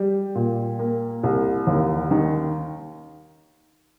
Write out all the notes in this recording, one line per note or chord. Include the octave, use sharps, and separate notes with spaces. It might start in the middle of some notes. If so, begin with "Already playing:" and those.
Already playing: G3
A#2
A#3
C2
D#2
D#3